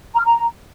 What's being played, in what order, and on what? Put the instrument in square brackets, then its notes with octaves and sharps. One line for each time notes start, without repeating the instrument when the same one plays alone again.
[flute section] A#5
F6
A#5